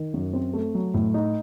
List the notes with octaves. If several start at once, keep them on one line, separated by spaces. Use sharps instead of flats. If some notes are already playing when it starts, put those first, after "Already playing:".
Already playing: D#3
F#2
C4
A3
F#3
A2
D#4